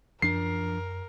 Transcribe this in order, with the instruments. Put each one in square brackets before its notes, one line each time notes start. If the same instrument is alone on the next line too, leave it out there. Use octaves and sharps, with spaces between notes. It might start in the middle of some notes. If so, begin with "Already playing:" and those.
[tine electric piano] F#2 [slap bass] F3 D4 [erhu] A#4 [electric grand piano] C7